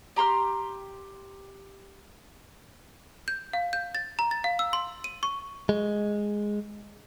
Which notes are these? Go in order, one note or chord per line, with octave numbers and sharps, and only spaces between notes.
G4 A#5 C6 F6
G6
F5
G6
A6
A#5
A6
F5
E6
C6
D#7
C#6
G#3